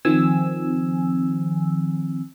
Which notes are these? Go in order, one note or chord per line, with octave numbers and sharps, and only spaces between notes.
D#3 F3 C4 G#5 E6